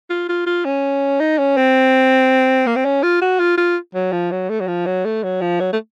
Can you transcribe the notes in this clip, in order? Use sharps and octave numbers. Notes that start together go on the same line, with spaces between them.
F4
F4
F4
C#4
D#4
C#4
C4
A#3
C4
C#4
F4
F#4
F4
F4
F#3
F3
F#3
A3
F#3
F3
F#3
A3
F#3
F3
F#3
A3